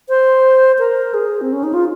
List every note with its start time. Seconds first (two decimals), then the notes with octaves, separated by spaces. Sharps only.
0.09 C5
0.79 A#4
1.14 G#4
1.41 C4
1.53 C#4
1.63 D#4
1.74 F4